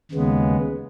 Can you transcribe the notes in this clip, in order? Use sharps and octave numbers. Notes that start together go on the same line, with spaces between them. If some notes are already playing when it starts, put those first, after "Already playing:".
D#2 C#3 G#3 B3